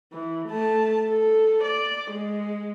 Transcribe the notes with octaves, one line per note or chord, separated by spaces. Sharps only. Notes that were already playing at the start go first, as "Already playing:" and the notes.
E3
A3 A5
A4
D5
G#3